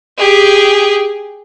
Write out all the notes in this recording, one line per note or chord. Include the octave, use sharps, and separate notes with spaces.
G4 G#4